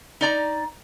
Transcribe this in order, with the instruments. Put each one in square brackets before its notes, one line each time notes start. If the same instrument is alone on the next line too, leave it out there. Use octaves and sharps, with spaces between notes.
[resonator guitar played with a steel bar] D#4 D5 A#5